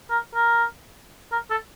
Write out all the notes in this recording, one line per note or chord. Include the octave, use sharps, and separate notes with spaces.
A#4
A#4
A#4
A4